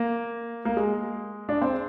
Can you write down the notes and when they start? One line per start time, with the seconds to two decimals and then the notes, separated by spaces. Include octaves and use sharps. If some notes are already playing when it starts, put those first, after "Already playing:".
Already playing: A#3
0.65 A#3
0.77 G#3
1.49 D4
1.61 C4